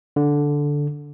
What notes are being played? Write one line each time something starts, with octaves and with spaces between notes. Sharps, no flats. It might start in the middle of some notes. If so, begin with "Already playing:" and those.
D3